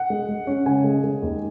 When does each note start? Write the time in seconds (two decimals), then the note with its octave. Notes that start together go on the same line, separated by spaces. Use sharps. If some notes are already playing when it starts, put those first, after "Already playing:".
Already playing: F#5
0.10 G#3
0.29 G#3
0.47 C#4
0.66 C#3 G#5
0.84 G#3
1.04 G#3
1.22 D#2